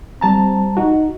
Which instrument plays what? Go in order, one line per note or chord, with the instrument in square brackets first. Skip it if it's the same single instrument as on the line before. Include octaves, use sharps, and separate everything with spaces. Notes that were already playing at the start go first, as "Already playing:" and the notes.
[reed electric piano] G3 A5 A#5 [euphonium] C4
[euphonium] D#4 [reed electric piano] F#4